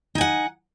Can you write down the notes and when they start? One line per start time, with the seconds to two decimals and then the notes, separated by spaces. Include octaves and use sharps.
0.15 D#4
0.18 G#5
0.21 F#5